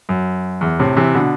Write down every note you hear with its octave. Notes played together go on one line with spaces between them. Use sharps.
F#2
E2
A2 C3
C3 E3
B2 D3